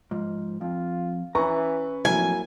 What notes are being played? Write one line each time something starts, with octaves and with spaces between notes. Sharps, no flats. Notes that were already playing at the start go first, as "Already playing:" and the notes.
G#2 F3
F2 F4
E3 C#4 B4 A#5 C#6
F2 A2 F#3 A#3 E4 A#4 G#5